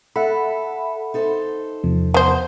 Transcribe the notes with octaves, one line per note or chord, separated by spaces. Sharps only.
A4 E5 F#5 B5
D#4 A4 C5
E2 C3 F3
B3 C5